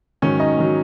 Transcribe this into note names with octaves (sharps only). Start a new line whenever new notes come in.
G#2 D#3 F#3 C#4 C#5
D#4 D#5
G#2 D#3 F#3